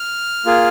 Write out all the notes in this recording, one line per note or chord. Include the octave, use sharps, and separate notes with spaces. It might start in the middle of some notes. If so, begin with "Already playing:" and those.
Already playing: F6
A#3 F4 G#4